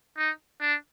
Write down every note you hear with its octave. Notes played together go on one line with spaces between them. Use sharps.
D#4
D4